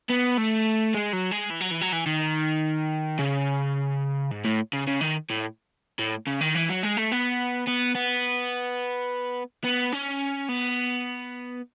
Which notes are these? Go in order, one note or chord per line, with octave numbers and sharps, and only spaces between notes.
B3
A3
G#3
F#3
G#3
E3
F#3
E3
F#3
E3
D#3
C#3
G#2
A2
C#3
C#3
D#3
A2
A2
C#3
D#3
E3
F#3
G#3
A3
B3
B3
B3
B3
C#4
B3